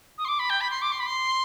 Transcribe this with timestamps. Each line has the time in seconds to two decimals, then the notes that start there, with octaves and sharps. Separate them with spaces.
0.18 D#6
0.25 C6
0.28 D6
0.39 B5
0.50 G5
0.61 B5
0.71 C6
0.82 D6
0.92 C6
1.00 B5
1.07 C6